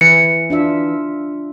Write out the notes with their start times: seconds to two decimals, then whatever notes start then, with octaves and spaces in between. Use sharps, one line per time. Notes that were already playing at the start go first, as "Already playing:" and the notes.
0.01 E3 C#7
0.50 D4 F4 E5